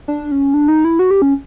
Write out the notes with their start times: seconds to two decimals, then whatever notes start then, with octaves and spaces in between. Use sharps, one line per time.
0.08 D4
0.32 C#4
0.54 D4
0.68 D#4
0.85 E4
0.99 F#4
1.11 G4
1.22 C#4